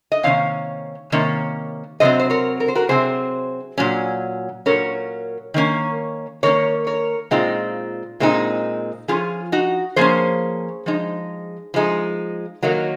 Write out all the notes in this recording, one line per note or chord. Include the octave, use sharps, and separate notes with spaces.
D#5
C3 D#3 A#3 C#4 C#5 F5
C3 D#3 A#3 C#4
C3 F#3 C4 C5 D#5
C5
A#4 C#5
A#4
C5
F#4 A#4
C3 F#3 C4 G#4 C5
A#2 F#3 C#4
A#2 F#3 C#4 A#4 C#5
D#3 A#3 C#4
D#3 A#3 C#4 A#4 C#5
A#4 C#5
A#2 G#3 C4 D#4 F4
A#2 G#3 C4 D#4
F3 A#3 C#4 F4 G#4
D#4 F#4
F3 A#3 C#4 G#4 C5
F3 G#3 D#4
F3 G#3 D#4
D#3 F#3 A#3 D#4